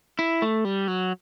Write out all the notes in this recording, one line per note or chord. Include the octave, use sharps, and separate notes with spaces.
E4
A3
G3
F#3